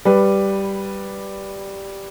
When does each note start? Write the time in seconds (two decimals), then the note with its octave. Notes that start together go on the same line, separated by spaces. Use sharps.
0.05 G3 B4